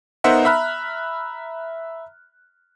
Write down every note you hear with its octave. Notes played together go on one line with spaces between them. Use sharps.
B3 D#4 A#4 C5 E5 F#5
E5 A#5 B5 F6 F#6